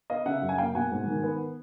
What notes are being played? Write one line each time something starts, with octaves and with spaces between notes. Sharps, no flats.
B3 D#5 F5
C#3 E5 F#5
F#2
G#5
A#3 F5 G5
B2 F#5 G#5
G#2
D#3
B3